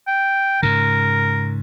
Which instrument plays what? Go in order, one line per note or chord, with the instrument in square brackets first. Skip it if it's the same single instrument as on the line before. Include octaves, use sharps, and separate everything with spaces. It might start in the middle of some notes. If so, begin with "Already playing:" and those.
[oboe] G5
[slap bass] G#2 C#3 [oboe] A#4